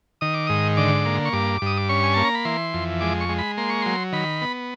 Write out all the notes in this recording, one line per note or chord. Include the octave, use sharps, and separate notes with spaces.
D#3 D#6
D6
G#2 D#6
D3 D6
A#3
C#6
G2 D6
G2 D#6
D6
C#4 C#6
G#5
A#3 A5
A#5
B5
E3 C6
F2
G#3 D6
C#6
G#3
B5
A#3 C6
C#6
F#3 C6
D#3 B5
B3